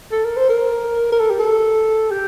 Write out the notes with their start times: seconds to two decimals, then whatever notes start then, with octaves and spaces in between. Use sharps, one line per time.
0.12 A4
0.25 A#4
0.37 C5
0.49 A#4
1.12 A#4
1.20 A4
1.30 G4
1.39 A4
2.11 G4